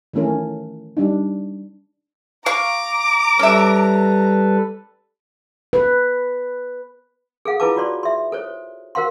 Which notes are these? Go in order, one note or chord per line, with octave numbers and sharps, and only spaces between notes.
D#3 E3 A3 C#4 A#4
G3 D4 D#4
F5 A#5 C#6 D6
G3 C#4 A4 B4 E5
B4
G#4 A4 F5 F#5
E4 F4 G#4 B4 A5 D6
F4 F#4 C#5 D5 C6
E5 C6
A4 C5 C#5
F#4 A#4 C5 F5 F#5 C6